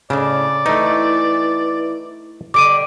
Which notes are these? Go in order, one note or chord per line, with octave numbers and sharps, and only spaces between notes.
A2 C#3 D4 D5
E3 A3 D#4
D3 G3 D6 D7 D#7